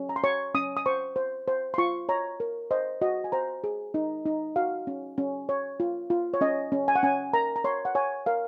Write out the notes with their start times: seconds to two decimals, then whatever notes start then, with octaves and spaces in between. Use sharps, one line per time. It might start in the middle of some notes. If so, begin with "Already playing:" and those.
Already playing: C#4
0.09 A#5
0.16 C6
0.24 C#5 C#6
0.54 C#4 D#6
0.77 D#6
0.86 C5 C#6
1.16 C5
1.48 C5
1.74 C6
1.78 F4 C#6
2.09 C#5 A#5
2.40 A#4
2.71 C5 D#5
3.02 F#4 D#5
3.24 G#5
3.32 C5 A#5
3.64 G#4
3.94 D#4
4.26 D#4
4.56 F#4 F5
4.87 C#4
5.18 C#4
5.49 C#5
5.80 F4
6.10 F4
6.34 C#5
6.41 C#4 D#5
6.72 C#4
6.88 G#5
6.95 F#5
7.03 C#4 G#5
7.33 A#4 A#5
7.56 A#5
7.64 C#5 C6
7.85 F#5
7.95 C#5 G#5
8.26 A#4 F5